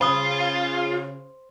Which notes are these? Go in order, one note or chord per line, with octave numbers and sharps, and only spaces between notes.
C#3 F4 C5 B5 D#6